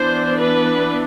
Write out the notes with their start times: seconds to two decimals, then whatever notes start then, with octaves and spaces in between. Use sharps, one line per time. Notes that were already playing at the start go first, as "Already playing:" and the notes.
Already playing: E3 B3 D4 C5
0.38 B4